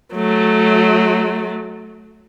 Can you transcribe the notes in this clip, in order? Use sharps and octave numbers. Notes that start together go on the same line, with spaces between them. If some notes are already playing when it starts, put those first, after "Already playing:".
F#3 A3